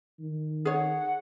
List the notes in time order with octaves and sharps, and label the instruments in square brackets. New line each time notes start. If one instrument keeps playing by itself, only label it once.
[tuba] D#3
[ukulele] G#4 C#5 [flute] F#5